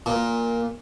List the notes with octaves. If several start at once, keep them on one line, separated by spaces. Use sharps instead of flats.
A#2